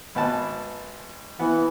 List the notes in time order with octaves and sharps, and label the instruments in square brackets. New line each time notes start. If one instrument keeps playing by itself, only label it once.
[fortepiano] G#1 B3 A5
[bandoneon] E3 [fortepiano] B3